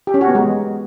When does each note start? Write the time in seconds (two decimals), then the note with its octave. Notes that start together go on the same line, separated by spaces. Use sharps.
0.07 G4
0.14 C#4
0.21 F#4
0.28 B3
0.35 G#3